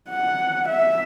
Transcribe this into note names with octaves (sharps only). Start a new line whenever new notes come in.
F#5
E5